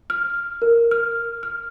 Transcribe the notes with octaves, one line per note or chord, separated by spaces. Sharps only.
F6
A#4
F6
F6